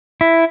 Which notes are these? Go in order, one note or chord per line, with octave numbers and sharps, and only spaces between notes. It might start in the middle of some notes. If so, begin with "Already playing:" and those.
E4